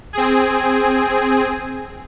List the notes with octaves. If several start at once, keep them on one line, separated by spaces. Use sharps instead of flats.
C4 G#4